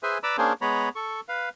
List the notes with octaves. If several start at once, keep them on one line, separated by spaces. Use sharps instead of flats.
G#4 B4 C5 E5 G#5
B4 D5 A#5 B5 D6 E6
A#3 C#4 D4 G#4 C5
G#3 B3 C#5 A#5 B5
A4 C#6
B4 F5